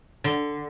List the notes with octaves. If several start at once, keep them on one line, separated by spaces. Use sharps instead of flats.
D3